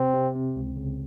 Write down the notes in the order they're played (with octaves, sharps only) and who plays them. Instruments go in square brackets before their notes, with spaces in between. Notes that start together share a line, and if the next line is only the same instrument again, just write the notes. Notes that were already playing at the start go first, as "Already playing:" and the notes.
Already playing: [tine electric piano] C3 [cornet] C4
[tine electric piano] C3
C4
C#2
C#3